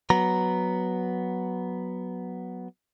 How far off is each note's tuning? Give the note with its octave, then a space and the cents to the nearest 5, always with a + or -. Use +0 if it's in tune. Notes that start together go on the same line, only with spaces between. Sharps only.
F#3 +0 B3 +0 A#5 +0